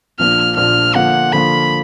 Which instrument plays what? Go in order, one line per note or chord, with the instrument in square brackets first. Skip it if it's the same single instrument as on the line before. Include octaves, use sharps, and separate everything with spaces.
[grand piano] A#1 A#2 F3 A#3 D4 [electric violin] F6
[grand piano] A#1 A#2 F3 A#3 D4 [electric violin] F6
[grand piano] D3 F3 A#3 F4 [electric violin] F#5
[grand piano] D3 F3 A#3 F4 [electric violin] B5